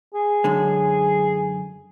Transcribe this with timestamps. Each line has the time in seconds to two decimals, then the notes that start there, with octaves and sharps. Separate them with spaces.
0.14 G#4
0.44 F#2 D3 G#3